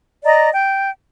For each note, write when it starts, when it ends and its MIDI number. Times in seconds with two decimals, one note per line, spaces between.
0.25 0.49 74
0.25 0.49 75
0.25 0.49 82
0.52 0.91 79